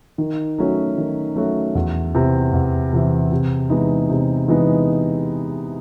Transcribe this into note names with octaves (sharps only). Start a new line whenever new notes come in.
D#3
F#3 A3 C#4 F#4
D#3
F#3 A3 C#4 F#4
E2
C3 E3
E2
C3 E3
C3
E3 G#3 B3 D#4
C3
E3 G#3 B3 D#4